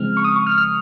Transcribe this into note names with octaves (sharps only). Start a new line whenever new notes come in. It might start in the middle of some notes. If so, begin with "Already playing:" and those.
Already playing: C#3 F3 G#3 C4 F6
C#6
D#6
C#6
F6
F6